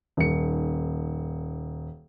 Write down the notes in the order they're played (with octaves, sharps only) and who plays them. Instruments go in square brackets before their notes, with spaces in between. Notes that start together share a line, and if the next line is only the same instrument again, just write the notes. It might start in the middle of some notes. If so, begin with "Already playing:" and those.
[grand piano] D#1 C#7